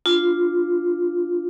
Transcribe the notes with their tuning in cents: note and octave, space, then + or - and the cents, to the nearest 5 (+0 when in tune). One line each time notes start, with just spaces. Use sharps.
D4 +0 F4 +0